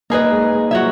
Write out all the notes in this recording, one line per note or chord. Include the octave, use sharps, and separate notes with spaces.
A#3 D#4 G#4 B4 D#5
G#3
G#3
F#3 F#4 C#5 E5